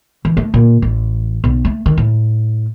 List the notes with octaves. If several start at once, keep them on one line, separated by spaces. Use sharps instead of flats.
E3
A3
A#2
A1
B1
A3
D#3
A2